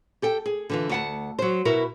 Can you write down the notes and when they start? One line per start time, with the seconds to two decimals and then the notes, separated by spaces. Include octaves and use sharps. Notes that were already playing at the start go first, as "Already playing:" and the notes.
0.22 G4 A4 G5
0.46 G#4
0.70 D3 E3 F4
0.89 D2 F#5 A5
1.39 F#3 C5
1.65 B2 E4 F#4 A#4